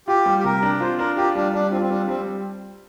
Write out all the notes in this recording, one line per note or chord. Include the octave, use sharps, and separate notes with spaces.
F4 G4
G3
G4
C3 A#4
D4
F4 C5
D4 A#4
F4 G4
G3 D4
G3 D4
C4 F4
C4
G3 D4
G3 C4